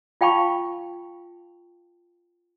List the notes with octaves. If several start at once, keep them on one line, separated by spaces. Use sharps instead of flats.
F4 F5 G5 A5 B5 C#6